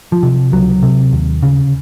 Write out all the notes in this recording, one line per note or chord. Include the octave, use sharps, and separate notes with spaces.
F3
C3
C#2 F#3
C3
D#2
C#3